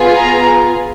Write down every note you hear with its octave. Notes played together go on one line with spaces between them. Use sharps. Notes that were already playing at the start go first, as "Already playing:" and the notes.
Already playing: B3 F4 G#4
A#5